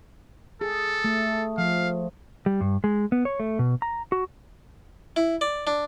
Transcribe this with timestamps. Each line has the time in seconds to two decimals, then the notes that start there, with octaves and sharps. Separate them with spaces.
0.61 G#4 A4
1.04 A3
1.58 F3 F5
2.46 G3
2.61 G2
2.84 G#3
3.12 B3
3.25 C#5
3.40 A3
3.59 B2
3.82 A#5
4.12 F#4
5.16 E4
5.41 D5
5.67 D4